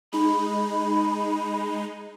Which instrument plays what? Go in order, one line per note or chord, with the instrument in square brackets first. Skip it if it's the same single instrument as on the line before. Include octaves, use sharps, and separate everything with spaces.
[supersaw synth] G#3 D#4 [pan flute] B5